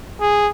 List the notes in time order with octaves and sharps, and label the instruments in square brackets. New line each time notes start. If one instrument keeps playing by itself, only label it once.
[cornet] G#4